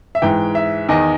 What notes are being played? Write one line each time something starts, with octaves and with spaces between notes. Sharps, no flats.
E5
G#2 E3 G5
E5
E2 D#3 D#5